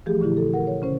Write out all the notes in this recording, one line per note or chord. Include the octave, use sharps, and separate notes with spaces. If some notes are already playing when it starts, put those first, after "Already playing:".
E3 F3 A3 G4 G#4
A#2 D3 E4 G4
A4
A#4 F#5
C#5
C#3 C#4 C5